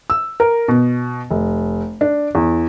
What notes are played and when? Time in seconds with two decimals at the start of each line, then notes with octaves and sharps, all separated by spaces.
0.10 E6
0.40 A#4
0.68 B2
1.30 F1
2.01 D4
2.35 E2